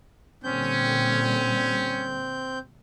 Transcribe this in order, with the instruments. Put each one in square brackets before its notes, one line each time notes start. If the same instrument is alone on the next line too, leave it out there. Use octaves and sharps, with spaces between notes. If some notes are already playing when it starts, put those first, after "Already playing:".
[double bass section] A#2 D3 G3 [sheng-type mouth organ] C4 G6 [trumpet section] C#4